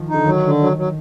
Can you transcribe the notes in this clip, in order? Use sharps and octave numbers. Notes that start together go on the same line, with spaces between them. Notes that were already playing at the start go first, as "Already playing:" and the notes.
Already playing: D#3 F3
D#4
D3
D#3 F#3
D3
F#3
F#3